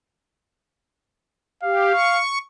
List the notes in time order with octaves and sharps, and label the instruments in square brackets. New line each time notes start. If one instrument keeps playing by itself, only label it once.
[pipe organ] G4 [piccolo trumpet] F5
[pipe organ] C#6